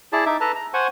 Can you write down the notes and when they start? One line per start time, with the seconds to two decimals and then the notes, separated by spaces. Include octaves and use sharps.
0.13 E4 G#4 D5 A5
0.26 D#4 E5 D6
0.41 A4 B4 A5 A#5
0.55 A#5
0.74 C5 F#5 G#5 C#6